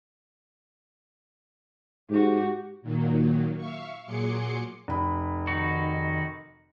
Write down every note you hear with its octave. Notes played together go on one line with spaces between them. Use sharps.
G#2 F#4 G4
A#2 D#3 F#3 A#3
E5 F5 C#6
A#2 F#3 G#4 C6 D6 C#7
F1 B5
D#3 D#4 F#4